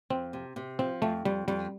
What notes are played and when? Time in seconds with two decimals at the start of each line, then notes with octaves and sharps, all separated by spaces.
0.10 F2 C4
0.33 C3
0.56 C3
0.79 F3 C4
1.02 F2 A3
1.25 F2 G3
1.48 F2 G3